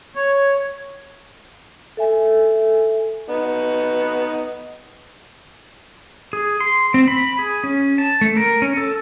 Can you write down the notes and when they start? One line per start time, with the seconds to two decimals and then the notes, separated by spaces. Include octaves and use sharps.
0.15 C#5
1.97 A4 E5 G#5
3.28 B3 D#4
6.33 G#4
6.60 C6
6.94 C4
7.08 B5
7.39 G#4
7.64 C#4
7.98 A5
8.21 A3
8.37 A#4
8.62 C#4
8.77 A4